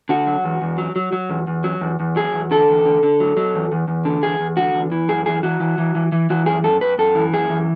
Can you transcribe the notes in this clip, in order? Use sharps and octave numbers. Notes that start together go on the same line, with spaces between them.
D3 F#4
F#3
E2
E2
F#3
F#3
F#3
E2
E2
F#3
E2
E2
F#3 G#4
E2
D3 A4
E2
D3
D3
F#3
F#3
E2
E2
E2
D3
E2 G#4
E2
D3 F#4
E2
E3
F#2 G#4
E3 G#4
E3 F#4
E3
E3
E3
E3
E3 F#4
F#2 G#4
F#2 A4
F#2 B4
F#2 A4
E3
F#2 G#4
E3